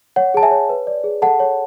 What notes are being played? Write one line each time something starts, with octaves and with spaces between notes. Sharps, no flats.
C#5 F#5
G#4 A5
E5 G#5
C#5
B4
D5
G#4
A4 F#5 A5
C#5